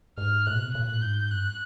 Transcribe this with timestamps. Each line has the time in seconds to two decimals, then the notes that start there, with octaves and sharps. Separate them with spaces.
0.18 G#2 F6
0.46 A2 F#6
0.55 B2
0.65 C3
0.74 A#2 F#6
0.88 A2
1.02 G#2 G6
1.31 G2 F#6